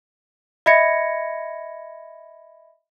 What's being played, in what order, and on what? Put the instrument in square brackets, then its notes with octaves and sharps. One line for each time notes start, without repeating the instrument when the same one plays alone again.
[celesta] D#5 E5 B5 G#6 A#6 C#7